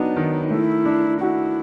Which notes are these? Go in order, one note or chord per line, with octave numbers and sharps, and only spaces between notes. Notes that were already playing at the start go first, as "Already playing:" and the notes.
Already playing: F#3 B3 D4 D#4
D#3
A3 E4
D4
E4 F#4